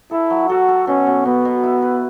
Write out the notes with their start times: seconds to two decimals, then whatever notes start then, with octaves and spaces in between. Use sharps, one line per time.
0.11 E4 A4
0.30 F#3
0.49 F#4 A4
0.68 A4
0.87 B2 C#4
1.07 B2
1.25 B2 B3
1.45 B2
1.63 E4
1.82 B4